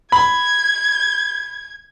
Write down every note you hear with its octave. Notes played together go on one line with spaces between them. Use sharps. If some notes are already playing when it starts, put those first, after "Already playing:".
B5 G#6